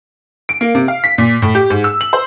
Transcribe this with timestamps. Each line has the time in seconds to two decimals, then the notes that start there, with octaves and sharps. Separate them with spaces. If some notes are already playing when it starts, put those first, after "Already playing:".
0.49 D7
0.61 A#3
0.75 C3
0.88 F5
1.04 B6
1.18 A#2
1.42 A2
1.55 G4
1.70 G#2
1.84 E6
2.01 F#7
2.13 C5